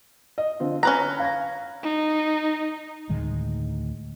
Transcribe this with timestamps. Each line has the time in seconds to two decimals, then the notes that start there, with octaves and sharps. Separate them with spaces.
0.38 D#5
0.60 D3 C4 F4
0.83 C#4 B4 A#5 F#6
1.19 F5 G#6 A#6
1.84 D#4
3.10 D2 A2 D#3 G#3